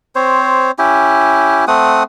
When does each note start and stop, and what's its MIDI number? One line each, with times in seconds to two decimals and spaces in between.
0.16 0.71 60
0.16 0.71 72
0.16 0.71 73
0.79 1.65 61
0.79 1.65 64
0.79 1.65 67
1.68 2.03 57
1.68 2.03 60
1.68 2.03 78
1.68 2.03 87